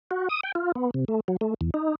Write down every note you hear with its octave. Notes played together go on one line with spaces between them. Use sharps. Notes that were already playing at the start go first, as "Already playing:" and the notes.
F#4
D#6
G5
F4
B3
C3
A3
F#3
A3
E2
D#4